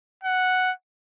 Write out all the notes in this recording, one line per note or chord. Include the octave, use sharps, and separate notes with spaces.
F#5